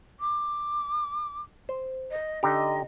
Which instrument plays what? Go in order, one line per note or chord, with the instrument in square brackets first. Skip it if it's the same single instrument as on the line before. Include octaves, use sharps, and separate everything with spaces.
[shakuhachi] D6
[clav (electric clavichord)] C5
[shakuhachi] D#5
[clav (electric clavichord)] D3 D#4 G4 [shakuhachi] D#5